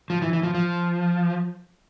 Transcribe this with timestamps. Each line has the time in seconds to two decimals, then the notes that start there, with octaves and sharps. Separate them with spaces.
0.10 F3
0.22 E3
0.33 E3
0.43 F3
0.55 F3